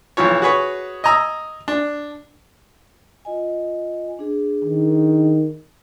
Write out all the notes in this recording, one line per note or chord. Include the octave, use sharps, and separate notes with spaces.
B1 E3 F3 C#5
F#4 G#4 B4 C#5
D#5 G#5 A#5 D#6 E6
D4
F4 D#5 G#5
D4 G#4
D#3